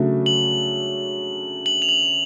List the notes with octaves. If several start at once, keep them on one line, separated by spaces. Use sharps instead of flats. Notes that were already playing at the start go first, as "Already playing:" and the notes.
Already playing: C#3 F#3 A3 D4 F#4
F#7
F#7
F7
F#7